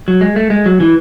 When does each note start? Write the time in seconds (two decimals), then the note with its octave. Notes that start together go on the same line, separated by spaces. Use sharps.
0.08 F#3
0.21 G#3
0.36 A3
0.50 G#3
0.66 F#3
0.80 E3